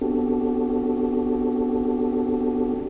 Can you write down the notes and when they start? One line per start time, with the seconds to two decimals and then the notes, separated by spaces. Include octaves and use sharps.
0.01 B3 C4 D4 F#4 G4 A4